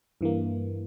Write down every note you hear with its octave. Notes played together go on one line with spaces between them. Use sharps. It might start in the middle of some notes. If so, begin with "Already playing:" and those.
G2 E3 A#3